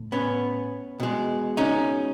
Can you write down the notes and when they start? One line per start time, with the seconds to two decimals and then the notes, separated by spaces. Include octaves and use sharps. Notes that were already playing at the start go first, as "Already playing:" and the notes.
Already playing: A2
0.12 B3 C#4
1.00 B2 G#3
1.57 C#4 D#4